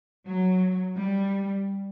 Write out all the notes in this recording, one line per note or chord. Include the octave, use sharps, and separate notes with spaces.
F#3
G3